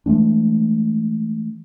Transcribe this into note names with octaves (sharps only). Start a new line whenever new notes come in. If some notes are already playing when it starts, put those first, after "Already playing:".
E3 G#3 A3 D4